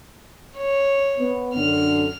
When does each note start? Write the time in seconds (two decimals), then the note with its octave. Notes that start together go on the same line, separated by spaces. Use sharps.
0.57 C#5
1.18 B3
1.55 F#2 D3 F6